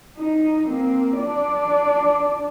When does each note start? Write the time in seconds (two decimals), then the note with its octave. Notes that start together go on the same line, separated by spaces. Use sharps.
0.18 D#4
0.67 A#3 C4
1.18 D4 D5